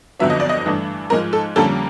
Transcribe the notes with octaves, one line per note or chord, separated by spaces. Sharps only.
G1 F2 D3 F#3 B3 E5
D#5
D5
D#5
G2 E3 A3 D4
G#2 F3 G#3 A#4
A4
F2 D3 G3 A#3 C#4 A4